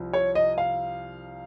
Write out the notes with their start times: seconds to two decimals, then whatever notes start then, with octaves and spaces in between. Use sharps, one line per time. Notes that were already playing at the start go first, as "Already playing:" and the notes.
Already playing: C2 F3
0.13 C#5
0.35 D#5
0.58 F5